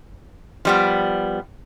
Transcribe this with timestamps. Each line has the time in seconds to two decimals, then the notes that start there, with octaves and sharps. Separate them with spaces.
0.65 F3 G3 B3